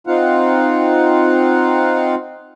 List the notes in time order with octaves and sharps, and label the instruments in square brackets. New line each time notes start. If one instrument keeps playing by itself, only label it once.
[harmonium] C4 D#4 F4 F5 F#5